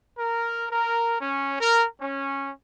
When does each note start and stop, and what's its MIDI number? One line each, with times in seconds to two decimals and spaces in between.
0.18 0.66 70
0.71 1.17 70
1.21 1.55 61
1.61 1.86 70
2.01 2.52 61